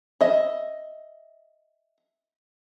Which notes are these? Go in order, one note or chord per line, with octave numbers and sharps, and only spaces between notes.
D#5 E5